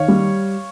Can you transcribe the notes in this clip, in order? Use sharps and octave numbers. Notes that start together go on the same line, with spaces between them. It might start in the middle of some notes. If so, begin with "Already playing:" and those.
Already playing: D#3 C#5 F5
G3